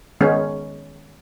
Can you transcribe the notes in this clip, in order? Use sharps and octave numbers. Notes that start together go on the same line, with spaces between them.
D#3 G#3 B3 C#4